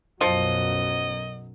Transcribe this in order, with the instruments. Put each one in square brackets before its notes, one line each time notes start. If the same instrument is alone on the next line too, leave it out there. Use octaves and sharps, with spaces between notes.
[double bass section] B1 F#2 F#3 [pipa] F3 [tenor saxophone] D#5